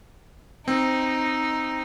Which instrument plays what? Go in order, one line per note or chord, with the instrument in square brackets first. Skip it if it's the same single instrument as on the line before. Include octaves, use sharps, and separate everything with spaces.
[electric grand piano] C4 [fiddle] D#4